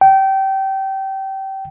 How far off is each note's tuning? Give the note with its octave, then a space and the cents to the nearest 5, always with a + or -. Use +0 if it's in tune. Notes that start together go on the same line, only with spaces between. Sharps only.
G5 -25